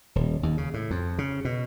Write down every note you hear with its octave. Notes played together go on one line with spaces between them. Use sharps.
D#1
D#2
C#3
A2
F2
C#3
B2